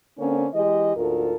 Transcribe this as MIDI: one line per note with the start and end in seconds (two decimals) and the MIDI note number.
0.18 0.46 50
0.18 0.46 58
0.18 0.46 60
0.18 0.46 61
0.54 0.92 52
0.54 0.92 56
0.54 0.92 67
0.54 0.92 75
0.97 1.35 38
0.97 1.35 44
0.97 1.35 65
0.97 1.35 69
0.97 1.35 70